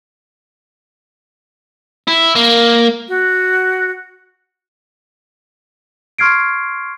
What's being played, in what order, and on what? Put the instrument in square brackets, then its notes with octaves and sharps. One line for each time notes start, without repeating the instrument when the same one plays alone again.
[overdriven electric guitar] E4
A#3
[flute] F#4
[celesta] C6 C#6 F6 G#6 C7 D7